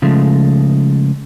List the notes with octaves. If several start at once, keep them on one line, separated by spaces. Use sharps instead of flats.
C#3 F3 G#3 A3